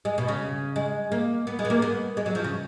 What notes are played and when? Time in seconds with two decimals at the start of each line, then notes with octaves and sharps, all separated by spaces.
0.05 G#3
0.18 B2
0.28 C#3
0.76 G#3
1.12 A#3
1.47 B3
1.59 G#3
1.65 B3
1.70 A#3
1.82 B3
2.17 G#3
2.26 F#3
2.35 F3
2.44 C#3